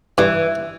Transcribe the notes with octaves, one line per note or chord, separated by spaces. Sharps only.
G2 E3